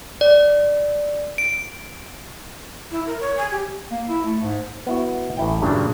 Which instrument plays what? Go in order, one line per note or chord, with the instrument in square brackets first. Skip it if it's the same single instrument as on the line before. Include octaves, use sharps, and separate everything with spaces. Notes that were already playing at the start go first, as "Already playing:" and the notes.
[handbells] D5
D7
[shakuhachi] E4
A#4
C#5
G#5
G4
[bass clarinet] A#3
E4
A3
G#2
[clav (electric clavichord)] B3 E4 F#4
A1 E4 G5
G2 A#2 C#3 F#3 D4